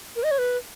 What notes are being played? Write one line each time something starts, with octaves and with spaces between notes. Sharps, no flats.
A#4
D#5
C#5
B4